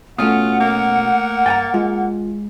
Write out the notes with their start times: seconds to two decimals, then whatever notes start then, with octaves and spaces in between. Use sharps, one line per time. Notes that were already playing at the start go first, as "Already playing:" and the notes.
0.18 B2 A3 C#4 F4 F#4 F#5 D#6
0.60 A#3
1.46 G2 G5 G#5 A#5 A6
1.74 G#3 F4